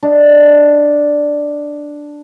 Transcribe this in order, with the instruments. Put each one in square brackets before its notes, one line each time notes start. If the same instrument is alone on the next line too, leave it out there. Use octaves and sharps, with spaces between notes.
[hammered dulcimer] D4 D#5